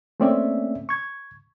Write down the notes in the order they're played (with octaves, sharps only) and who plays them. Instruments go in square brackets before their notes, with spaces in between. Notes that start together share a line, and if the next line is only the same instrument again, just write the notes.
[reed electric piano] A3 A#3 C4 C#4 D5 E5
C#6 G#6